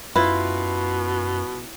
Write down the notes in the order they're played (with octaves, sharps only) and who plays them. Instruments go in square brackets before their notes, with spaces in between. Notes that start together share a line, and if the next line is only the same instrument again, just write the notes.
[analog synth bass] F#2 [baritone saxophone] B2 [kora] E4 F4 [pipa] B4